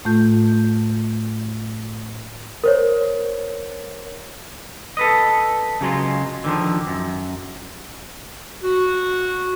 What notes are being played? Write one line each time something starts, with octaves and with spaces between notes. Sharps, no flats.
A2 A3 F4 G6
A#4 C5 C#5
A4 B4 D#5
C#3 F#3 G#3 F4
D3 D#3 F3
F#2
F#4